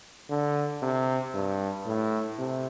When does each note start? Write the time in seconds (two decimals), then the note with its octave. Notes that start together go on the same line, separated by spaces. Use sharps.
0.30 D3
0.82 C3
1.34 G2
1.86 A2
2.39 C3